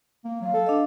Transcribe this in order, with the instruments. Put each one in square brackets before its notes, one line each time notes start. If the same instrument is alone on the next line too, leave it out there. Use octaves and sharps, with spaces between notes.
[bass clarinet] A#3
[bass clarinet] F#3 [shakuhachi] F5
[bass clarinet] A4
[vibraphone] D4 D#5